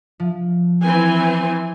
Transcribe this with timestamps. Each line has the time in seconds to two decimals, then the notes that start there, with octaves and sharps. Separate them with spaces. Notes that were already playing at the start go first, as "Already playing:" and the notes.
0.20 F3
0.83 E3 C4 G#5